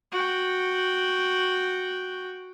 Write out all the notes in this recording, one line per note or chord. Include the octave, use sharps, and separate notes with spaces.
F#4 G5